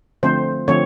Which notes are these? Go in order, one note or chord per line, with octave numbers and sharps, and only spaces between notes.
D3 F3 A3 C4 C5
D3 F3 A3 C4 C#5